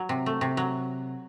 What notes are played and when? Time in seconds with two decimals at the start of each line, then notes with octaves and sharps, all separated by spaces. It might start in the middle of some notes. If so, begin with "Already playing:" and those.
Already playing: F#3
0.09 C3
0.26 A3
0.41 C3
0.57 F#3